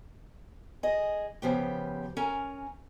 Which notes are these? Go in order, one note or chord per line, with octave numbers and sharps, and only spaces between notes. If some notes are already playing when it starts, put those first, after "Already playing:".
G#4 D#5
C#3 F3 B3 G4
C#4 A#4 G#5 A#5